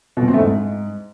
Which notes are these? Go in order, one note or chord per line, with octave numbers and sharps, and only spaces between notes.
B2
A#2
C4
A3
G#2